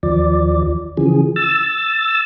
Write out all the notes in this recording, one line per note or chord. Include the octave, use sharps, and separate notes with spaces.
D#2 F3 D5
C#3 E3 F3 G#4
E6 A6